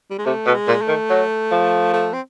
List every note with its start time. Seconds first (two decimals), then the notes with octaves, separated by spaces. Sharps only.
0.11 G3
0.19 G#3
0.25 C3 A3
0.46 B2
0.54 G#3
0.67 A#2
0.82 A3
0.88 D#3
1.10 F#3
1.52 F3
1.93 A3
2.13 C4